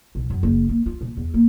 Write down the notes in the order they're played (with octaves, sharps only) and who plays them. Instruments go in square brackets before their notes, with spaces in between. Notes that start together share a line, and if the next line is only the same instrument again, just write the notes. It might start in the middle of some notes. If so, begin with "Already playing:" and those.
[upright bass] B1
F#2
F#1
A#3
F4
A#2
E2
A#3